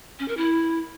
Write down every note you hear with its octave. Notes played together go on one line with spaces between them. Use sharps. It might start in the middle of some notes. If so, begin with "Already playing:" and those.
C#4
A#4
E4